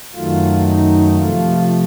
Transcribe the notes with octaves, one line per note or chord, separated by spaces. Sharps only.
F#2 D#3 F#3 A3 F4
D#4
C3 F3 A3 F4